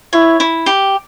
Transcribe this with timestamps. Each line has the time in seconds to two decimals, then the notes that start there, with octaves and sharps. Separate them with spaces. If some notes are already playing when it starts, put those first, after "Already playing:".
0.13 E4 C#5
0.40 E4
0.66 G4